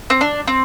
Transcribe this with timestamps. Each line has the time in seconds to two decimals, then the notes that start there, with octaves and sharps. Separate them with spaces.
0.10 C4
0.21 D4
0.47 C4